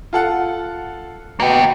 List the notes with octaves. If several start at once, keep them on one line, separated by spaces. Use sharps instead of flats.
F4 A4 F#5
B2 A#3 G5